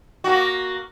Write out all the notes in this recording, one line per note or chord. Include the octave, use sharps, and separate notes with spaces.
A#3 F#4